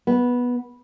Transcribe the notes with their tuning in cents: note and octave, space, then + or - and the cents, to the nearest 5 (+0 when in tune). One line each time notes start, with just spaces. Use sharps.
B3 -10